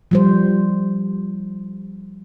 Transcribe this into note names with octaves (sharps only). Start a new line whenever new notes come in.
F3 G3 C5